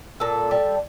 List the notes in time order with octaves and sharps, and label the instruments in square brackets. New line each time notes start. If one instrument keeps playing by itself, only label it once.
[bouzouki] A#2 A4
G3